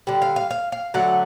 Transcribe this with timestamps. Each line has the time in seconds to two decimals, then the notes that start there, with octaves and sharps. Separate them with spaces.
0.07 D3 G3
0.22 F5
0.36 F5
0.51 F5
0.72 F5
0.94 D3 F#3 A3 F#5